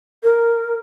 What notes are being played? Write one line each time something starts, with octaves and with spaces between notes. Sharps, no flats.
A#4